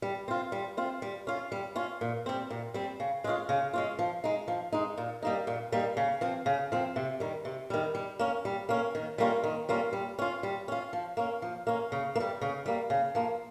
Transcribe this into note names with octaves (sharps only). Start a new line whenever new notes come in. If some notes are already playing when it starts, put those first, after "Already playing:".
G3
C4 F4
G3
C4 F4
G3
C#4 F4
G3
C#4 F4
A#2
G3 C4
A#2
G3 C4
C#3
G#3 C#4 F4
C#3
G#3 C#4 F4
F3
G#3 D#4
F3
G#3 D#4
A#2
G3 A#3 D#4
A#2
G3 A#3 D#4
C#3
F3 C4
C#3
F3 C4
C3
D#3 G3
C3
D#3 G3
G3
A#3 C#4
G3
A#3 C#4
D#3
G3 A#3 C#4 F4
D#3
G3 A#3 C#4 F4
G3
C#4 F4
G3
C#4 F4
F3
A#3 C#4
F3
A#3 C#4
C#3
A#3
G3
C#3
G3 A#3
C#3
F3 A#3